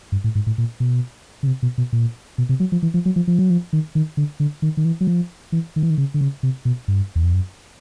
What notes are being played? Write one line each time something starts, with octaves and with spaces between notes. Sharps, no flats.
G2
A2
G#2
A2
A#2
B2
C#3
C3
B2
B2
A#2
B2
C3
F#3
F3
E3
F3
F#3
F3
F3
F#3
F3
D#3
D#3
D3
D3
D#3
D#3
E3
F#3
F3
E3
D#3
E3
D#3
C#3
D3
C#3
C3
B2
G2
E2
F2
F#2